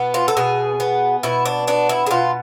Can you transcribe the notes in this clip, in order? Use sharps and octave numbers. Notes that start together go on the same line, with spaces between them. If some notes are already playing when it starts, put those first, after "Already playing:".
Already playing: B2 B3
F4
A4
B2 G#4
B3
B2 E4
D4
B3 D4
E4
G#4
B2 F4